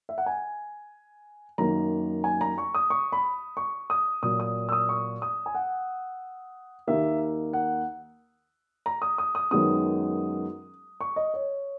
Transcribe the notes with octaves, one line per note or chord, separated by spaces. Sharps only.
E5
F#5
G#5
F#2 D#3 A#3 A#5
G#5
A#5
C#6
D#6
C#6
B5
C#6
D#6
A#2 F#3 A#3 D#6
D#6
E6
D#6
C#6
D#6
G#5
F#5
D#2 D#3 A#3 E5
F#5
A#5
D#6
D#6
D#6
F#2 D#3 G#3 B3 D#6
C#6
D#5
C#5